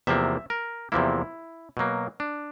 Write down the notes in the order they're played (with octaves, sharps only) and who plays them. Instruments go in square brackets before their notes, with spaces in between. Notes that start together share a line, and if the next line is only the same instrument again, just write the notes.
[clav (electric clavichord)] E2 C3 F3 A#3 E5
A#4
E2 C3 F3 A#3 E4
B2 F#3 A#3
D4